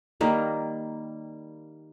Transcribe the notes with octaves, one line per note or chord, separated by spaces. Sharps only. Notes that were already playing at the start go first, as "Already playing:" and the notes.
D#3 G3 A#3